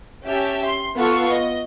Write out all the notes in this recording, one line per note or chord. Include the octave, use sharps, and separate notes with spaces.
C#4 G4 E5 A5
C6
B3 F4 A4 C#6
D#5